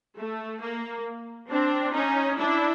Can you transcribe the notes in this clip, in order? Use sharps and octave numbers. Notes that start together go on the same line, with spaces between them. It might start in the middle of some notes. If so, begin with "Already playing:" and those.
A3
A#3
C4 D4
C#4 D#4
D4 E4